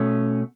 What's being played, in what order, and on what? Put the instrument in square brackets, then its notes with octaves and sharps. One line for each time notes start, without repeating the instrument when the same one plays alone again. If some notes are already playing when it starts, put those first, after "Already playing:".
Already playing: [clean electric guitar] B2 A3 C#4